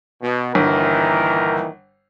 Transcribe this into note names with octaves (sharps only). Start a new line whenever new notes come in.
B2
G1 A#2 D#3 E3 A#4